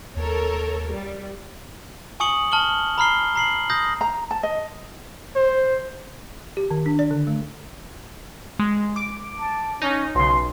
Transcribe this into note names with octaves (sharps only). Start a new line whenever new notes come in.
D#2 A4 A#4 C#5
G3
G#5 C#6 D#6 C#7 F#7
A5 F6 F#7 G7
A#5 B5 F6 C7 G7
A#5 C7 F#7
D#6 G6 A#6
A#5
A5
D#5
C5
G4
D#3
D4
D5
D3
A3
G#3
D6 D7
A5
C#4 D#4
B1 C#3 C6